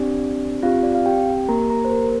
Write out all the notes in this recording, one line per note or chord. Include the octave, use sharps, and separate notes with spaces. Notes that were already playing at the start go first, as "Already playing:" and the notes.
Already playing: C4 D4 G4 D5
C4 F4 G4 F5
D5
F5
G4 G5
A#3 G4 A#4 A#5
A#4 A#5
C5
A#4
A#4